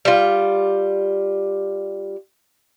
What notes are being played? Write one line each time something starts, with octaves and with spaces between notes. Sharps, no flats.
G3 F4